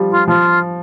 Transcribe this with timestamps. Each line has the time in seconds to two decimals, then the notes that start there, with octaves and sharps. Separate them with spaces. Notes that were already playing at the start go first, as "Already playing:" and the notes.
Already playing: F3 G3
0.10 F4
0.27 F3 F4